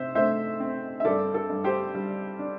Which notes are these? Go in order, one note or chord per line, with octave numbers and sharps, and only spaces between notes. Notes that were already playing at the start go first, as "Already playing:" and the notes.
Already playing: C3 C5 E5
A3 C5 E5
C4
E5
G2 A4 D5
A4
G2
G4 C5
G3
D4